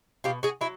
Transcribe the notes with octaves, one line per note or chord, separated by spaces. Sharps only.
B2 F4 G4
F#4 G#4
F#3 E4